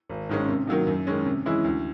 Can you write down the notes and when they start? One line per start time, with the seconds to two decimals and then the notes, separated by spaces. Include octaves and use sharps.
0.09 G#1
0.29 G#2 D#3 G#3 C#4
0.48 C3
0.67 D#3 F#3 A#3 D#4
0.87 F#2
1.07 D#3 G#3 C#4
1.26 C3
1.46 E3 G#3 C#4 E4
1.64 D2